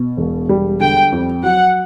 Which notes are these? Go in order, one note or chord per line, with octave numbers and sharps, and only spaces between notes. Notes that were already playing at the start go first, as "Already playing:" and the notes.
Already playing: B2
E1
G3
D3 G5
F2
F#3 F#5